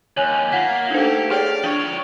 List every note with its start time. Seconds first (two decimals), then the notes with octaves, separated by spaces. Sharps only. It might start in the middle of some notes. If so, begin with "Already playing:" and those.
0.17 D#2 C#5 G#5 F#6
0.52 A#3 F4 F#5 B6
0.91 A3 D4 D#4 G4 C5
1.31 G#4 C#5 D5 F5 G5
1.64 F3 D4 C#5